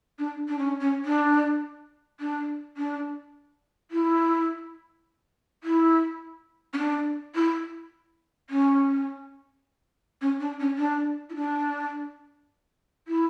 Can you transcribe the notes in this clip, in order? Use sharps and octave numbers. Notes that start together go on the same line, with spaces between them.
D4
D4
C#4
C#4
D4
D4
D4
E4
E4
C#4
D4
E4
C#4
C#4
D4
C#4
D4
E4
D4
E4